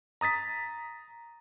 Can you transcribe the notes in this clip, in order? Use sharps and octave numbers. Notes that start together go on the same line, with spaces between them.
A#5 D#6 A6 B6